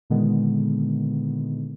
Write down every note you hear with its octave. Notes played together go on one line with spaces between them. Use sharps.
A#2 D3 D#3 G#3 B3